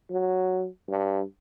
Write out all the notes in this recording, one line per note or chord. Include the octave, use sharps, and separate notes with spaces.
F#3
G2